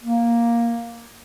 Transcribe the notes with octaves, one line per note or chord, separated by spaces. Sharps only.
A#3